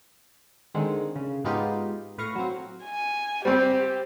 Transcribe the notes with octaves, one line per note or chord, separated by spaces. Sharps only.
D3 D#3 G#3 C4
C#3
G#2 G#3 B3 D#4 F4 G4
A2 B4 F5 C#6 A#6
F#3 C4
G#5
G3 C4 G4 C5